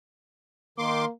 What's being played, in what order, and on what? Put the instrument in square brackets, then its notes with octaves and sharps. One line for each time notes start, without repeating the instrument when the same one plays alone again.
[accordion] D#3 C6 D6 [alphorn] A#3